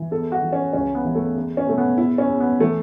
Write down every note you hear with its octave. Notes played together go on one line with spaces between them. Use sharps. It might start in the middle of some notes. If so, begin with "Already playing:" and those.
Already playing: E3
E2 A4
F#4
E3
C#4
C#2 C#4
B3
E3
A3
E2
C#4
B2 A3
B3
E2 E4
C#4
E2
B3
E3 A3